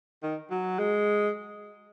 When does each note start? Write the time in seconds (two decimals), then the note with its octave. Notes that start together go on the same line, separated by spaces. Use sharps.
0.23 D#3
0.51 F#3
0.79 G#3